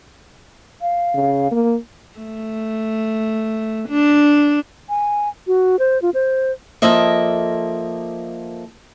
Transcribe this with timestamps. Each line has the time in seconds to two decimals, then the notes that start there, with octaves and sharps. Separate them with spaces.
0.81 F5
1.15 C#3
1.51 A#3
2.18 A3
3.89 D4
4.89 G#5
5.47 F#4
5.79 C5
6.02 F4
6.14 C5
6.82 F3 A#3 A4 D#5 E5